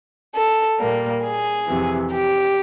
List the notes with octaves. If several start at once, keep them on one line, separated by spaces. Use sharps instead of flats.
A4
A#2 G3 A#3
G#4
F2 C3 E3
G4